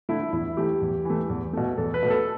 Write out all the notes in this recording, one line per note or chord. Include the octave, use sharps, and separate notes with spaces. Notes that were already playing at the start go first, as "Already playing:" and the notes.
D3 A3 E4
E2 E4
E3 A3 G4
E2
E3 A3
E2
B2 A3
E2 A4
B4
B2 A3
A4